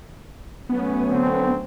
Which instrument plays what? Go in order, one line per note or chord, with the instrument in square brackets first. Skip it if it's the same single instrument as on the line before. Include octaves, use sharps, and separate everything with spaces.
[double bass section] F#3 A3 C#4 [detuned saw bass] B3
[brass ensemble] D3 C4